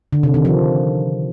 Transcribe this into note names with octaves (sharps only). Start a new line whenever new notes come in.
D3
C3
D#3
F3